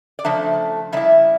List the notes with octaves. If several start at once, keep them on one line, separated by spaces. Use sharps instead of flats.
D5
C#3 F3 A3 D4 E5
C#3 G3 E4 E5